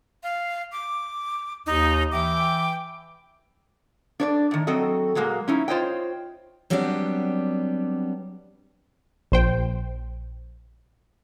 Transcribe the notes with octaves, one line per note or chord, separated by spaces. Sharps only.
F5
D6
D#2 D#4
E3 E5 G5 D6
D4 C#5 D5
A2 D#3
F#3 C4 F#4 A4 D#5
A#2 F#3 G#3 A#3
C#4 D#4 E4
F4 C5 C#5 D#5 G5
F#3 G3 B3 C4 D4 G4
A#1 C5 G5